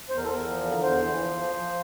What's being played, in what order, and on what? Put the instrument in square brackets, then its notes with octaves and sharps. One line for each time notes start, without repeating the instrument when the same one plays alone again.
[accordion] E2 C5
A#4
A4
E2 A#4
F3
D3
E2 C5
E3
F3
F3
F3